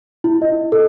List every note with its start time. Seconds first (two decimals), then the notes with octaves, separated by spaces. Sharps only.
0.24 E4
0.42 D#5
0.72 A4